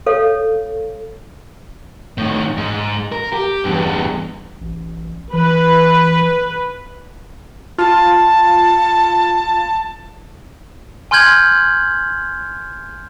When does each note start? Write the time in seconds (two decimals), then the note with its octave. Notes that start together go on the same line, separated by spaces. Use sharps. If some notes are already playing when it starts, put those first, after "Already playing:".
0.06 A4 C#5 F5
2.18 A2 D#3
2.57 G#2
3.12 A#4
3.33 G4
3.64 E2 G2
4.61 A1
5.33 E3 B4
7.78 F4 A5
11.11 G#5 C6 F6 G6 G#6 F#7